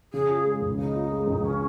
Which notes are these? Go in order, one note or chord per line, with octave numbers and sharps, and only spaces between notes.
C#3 G#4
F4
G#3
C#2
C#3 D#4
F4
G#3
C#2
C#3 C#4